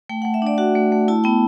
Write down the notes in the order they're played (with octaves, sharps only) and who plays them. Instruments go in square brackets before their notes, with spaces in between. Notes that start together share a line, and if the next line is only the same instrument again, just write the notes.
[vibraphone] A3 G5
F#5
A3
E5
D4 D5
F#4 F#5
A3
A3
E4 A5
B3 G5